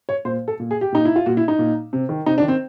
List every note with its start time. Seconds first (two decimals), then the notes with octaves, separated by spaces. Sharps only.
0.09 C#5
0.25 A#2 C5
0.48 A4
0.60 A#2
0.71 G#4
0.81 G4
0.92 A#2 D#4
1.05 E4
1.16 F4
1.26 A#2 F#4
1.37 E4
1.48 D#4
1.59 A#2
1.93 C3
2.09 D#3
2.26 C3 D#4
2.38 D4
2.42 D#3
2.48 C4